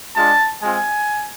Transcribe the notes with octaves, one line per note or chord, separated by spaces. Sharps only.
G#3 D4 F4 A5
G#3 C4 F4 G#5